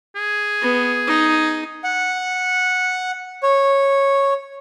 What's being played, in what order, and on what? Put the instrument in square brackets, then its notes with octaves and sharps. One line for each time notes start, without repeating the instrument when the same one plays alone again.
[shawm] G#4
[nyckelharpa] B3
D#4
[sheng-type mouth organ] F#5
C#5